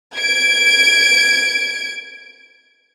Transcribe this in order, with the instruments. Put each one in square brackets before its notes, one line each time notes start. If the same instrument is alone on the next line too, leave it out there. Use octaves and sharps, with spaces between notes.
[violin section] G#6 D7